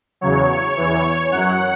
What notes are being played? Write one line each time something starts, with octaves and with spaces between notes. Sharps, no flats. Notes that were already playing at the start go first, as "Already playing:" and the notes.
E2 C#3 F#3 C#5
E2 E3
F#2 F#3 F#5